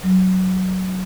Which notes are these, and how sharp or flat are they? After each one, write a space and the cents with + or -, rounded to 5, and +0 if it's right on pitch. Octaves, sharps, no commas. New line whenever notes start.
F#3 +10